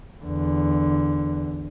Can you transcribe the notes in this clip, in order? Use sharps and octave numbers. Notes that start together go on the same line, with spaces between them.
E2 D3